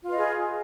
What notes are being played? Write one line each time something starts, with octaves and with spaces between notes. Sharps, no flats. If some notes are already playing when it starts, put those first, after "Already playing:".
F4 G#4 B4 D#5